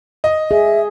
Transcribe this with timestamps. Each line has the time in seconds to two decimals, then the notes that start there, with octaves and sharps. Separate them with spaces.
0.24 D#5
0.51 G#4 E5